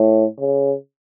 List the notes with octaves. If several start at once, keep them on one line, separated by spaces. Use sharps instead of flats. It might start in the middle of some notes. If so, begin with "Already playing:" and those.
Already playing: A2
C#3